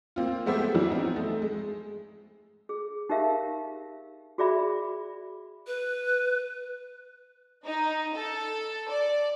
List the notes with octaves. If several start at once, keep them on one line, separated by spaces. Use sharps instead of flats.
A#3 C4 F4
G#3 A3 B3 G4 C5 E5
E3 F#3 G3 D4 E4
B3 C4 D#4
A3
G#3
G#4
D#4 G4 A#4 E5 F5
F#4 G#4 D5 E5 B5
B4
D#4
A4
D5